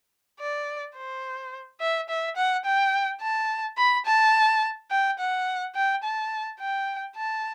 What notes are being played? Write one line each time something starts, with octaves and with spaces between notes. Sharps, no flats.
D5
C5
E5
E5
F#5
G5
A5
B5
A5
G5
F#5
G5
A5
G5
A5